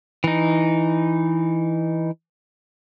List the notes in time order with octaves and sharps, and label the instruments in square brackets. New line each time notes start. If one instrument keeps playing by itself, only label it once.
[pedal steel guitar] E3 D#4